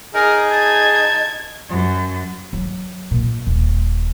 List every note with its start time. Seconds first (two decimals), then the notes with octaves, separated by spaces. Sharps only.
0.15 D#4 G#4 A#4
0.51 A5 G#6
1.70 F#2
2.53 F#3
3.11 A#2
3.47 D#1